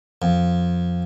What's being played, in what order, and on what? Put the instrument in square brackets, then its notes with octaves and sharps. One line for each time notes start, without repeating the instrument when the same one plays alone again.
[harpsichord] F2